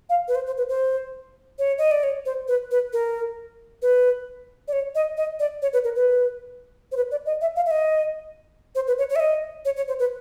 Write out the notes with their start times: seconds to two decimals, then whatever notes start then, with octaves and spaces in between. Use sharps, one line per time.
0.10 F5
0.28 B4
0.35 C5
0.46 C5
0.58 B4
0.69 C5
1.59 C#5
1.78 D#5
1.91 D5
2.03 C#5
2.26 C5
2.48 B4
2.71 B4
2.93 A#4
3.82 B4
4.68 D5
4.73 C#5
4.95 D#5
5.17 D#5
5.40 D5
5.62 C#5
5.73 B4
5.84 A#4
5.96 B4
6.92 C5
6.97 B4
7.11 D5
7.26 D#5
7.41 E5
7.56 F5
7.66 E5
7.71 D#5
8.75 C5
8.87 B4
8.98 C#5
9.10 C#5
9.16 E5
9.20 D#5
9.65 C#5
9.77 C#5
9.88 C5
9.99 B4